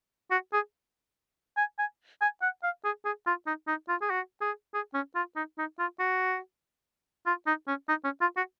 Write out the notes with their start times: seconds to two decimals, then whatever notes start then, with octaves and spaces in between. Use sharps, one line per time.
0.31 F#4
0.53 G#4
1.57 G#5
1.79 G#5
2.21 G#5
2.42 F#5
2.64 F5
2.85 G#4
3.05 G#4
3.27 F4
3.47 D#4
3.68 D#4
3.89 F4
4.02 G#4
4.11 F#4
4.41 G#4
4.74 G#4
4.94 C#4
5.15 F4
5.36 D#4
5.58 D#4
5.79 F4
5.99 F#4
7.26 F4
7.47 D#4
7.67 C#4
7.89 D#4
8.04 C#4
8.21 F4
8.37 F#4